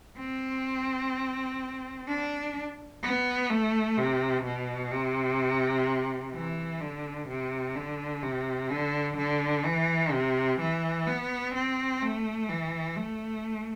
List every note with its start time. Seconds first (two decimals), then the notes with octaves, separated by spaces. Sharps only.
0.19 C4
2.08 D4
3.03 B3
3.50 A3
3.98 C3
4.45 B2
4.92 C3
6.34 E3
6.81 D3
7.29 C3
7.75 D3
8.23 C3
8.70 D3
9.17 D3
9.65 E3
10.12 C3
10.60 E3
11.07 B3
11.54 C4
12.02 A3
12.49 E3
12.97 A3